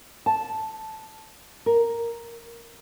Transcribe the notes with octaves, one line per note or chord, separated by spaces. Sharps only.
A5
A#4